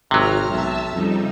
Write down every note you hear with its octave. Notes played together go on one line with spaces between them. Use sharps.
G#1 C3 F#3 A#5 F6
B1 E5 A5 E6
F2 C#3 G3 D#4